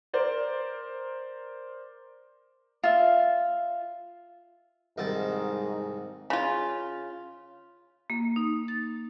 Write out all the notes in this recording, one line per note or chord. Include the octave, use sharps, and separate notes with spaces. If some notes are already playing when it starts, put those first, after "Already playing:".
A#4 C5 D5
F4 E5
C2 G#2 D#3 A5
C#3 F4
A#3
D#4
A6